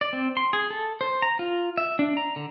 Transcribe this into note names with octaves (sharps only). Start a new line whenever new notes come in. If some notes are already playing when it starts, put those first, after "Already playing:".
D5
C4
C6
G#4
A4
C5
A#5
F4
E5
D4
A#5
D3